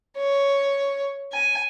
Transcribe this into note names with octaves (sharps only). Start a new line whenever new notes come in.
C#5
G#5